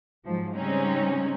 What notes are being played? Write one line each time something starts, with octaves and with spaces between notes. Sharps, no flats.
G#2 F3 F#3
C#3 G3 G#3 C4 C#4 D#4